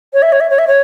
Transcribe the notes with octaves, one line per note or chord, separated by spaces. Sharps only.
C#5
E5
C#5
E5
C#5
E5
C#5